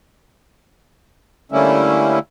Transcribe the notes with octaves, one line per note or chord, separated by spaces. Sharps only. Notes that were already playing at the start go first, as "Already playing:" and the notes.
D3 G3 A3 A#3 C#4 E4